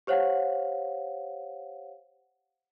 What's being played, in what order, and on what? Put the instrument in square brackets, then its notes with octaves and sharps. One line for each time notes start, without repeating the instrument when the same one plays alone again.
[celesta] G4 C5 C#5 F5 F#5